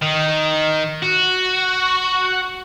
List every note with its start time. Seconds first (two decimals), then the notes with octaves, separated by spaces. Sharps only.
0.02 D#3
1.02 F#4